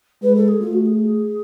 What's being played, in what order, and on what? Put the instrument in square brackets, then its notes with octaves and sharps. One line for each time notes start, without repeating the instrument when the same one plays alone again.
[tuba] G#3 [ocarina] B4
[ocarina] A4
G#4
[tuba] A3 [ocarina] F4
[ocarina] F#4
G#4